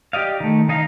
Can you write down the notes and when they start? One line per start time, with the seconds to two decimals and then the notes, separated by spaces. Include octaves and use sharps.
0.13 G4 D5 D#5 F5
0.40 D#3 A3
0.69 D#3 D#4 D#5 F5